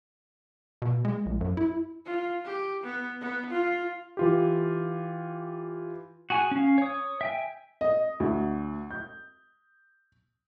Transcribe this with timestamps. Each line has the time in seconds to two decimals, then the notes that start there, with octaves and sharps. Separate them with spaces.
0.82 B2
1.05 G#3
1.26 A#1
1.41 F#2
1.57 E4
2.06 F4
2.45 G4
2.83 B3
3.21 B3
3.51 F4
4.17 E3 F4 G4
6.30 F#4 G#4 G#5
6.51 C#4 F5
6.78 C#5 D#6
7.21 E5 G5 G#5
7.81 D#5
8.20 D2
8.91 G6